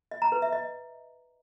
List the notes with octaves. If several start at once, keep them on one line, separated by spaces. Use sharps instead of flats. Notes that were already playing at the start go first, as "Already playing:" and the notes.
D#5
A#5
B4
E5
D#5